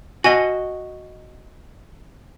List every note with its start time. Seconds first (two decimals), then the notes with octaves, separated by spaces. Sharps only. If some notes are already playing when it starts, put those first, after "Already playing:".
0.24 F#4 D#5 G#5